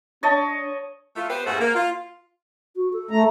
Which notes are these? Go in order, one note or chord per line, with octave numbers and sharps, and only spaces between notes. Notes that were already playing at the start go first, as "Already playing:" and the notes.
D4 C#5 D#5 A5
A3 F4
B3 G4 B4 C5
G2 A#2 A3 F#4 G#4 C5
A#3
F4
F#4
A4
A3 A#5